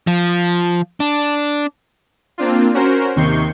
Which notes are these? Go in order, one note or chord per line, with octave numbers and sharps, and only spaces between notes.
F3
D4
A#3 C4 D4 F4
C#4 F#4 A#4 C5
D#2 C3 D#3 C#6 G6 C7